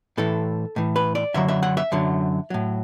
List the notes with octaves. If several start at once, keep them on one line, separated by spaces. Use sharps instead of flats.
A2 E3 A4
A2 E3
B4
D5
F#2 D3 F#3 E5
E5
F#5
E5
F#2 D3 F#3
A2 F#3